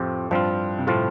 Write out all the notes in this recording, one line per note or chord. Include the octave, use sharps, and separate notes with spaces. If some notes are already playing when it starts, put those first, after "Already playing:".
Already playing: F2 A2 F3 C4 G4
G2 F3 C4 F4
C3
A2 F3 C4 F4